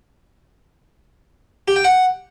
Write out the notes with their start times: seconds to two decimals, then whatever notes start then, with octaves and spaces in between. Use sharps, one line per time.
1.68 G4
1.76 G5
1.84 F#5